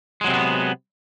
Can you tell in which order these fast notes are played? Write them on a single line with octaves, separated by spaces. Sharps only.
G#3 F#3 C3 C4 B3